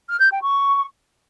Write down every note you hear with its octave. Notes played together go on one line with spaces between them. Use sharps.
F6
G6
G5
C#6